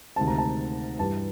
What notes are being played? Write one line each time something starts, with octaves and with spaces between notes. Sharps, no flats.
D2 C3 D#3 G#3 C4 A5
A#5
A5
G2 E3 G3 A5